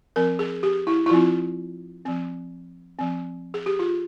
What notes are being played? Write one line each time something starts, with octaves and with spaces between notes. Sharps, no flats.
F3 C4 A#4
G#4
G4
E4
E4
F3 C4 F4
F3 C4
F3 C4
G#4
G4
F4